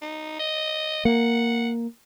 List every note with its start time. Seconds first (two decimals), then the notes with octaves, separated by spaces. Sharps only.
0.01 D#4
0.39 D#5
1.05 A#3 F#5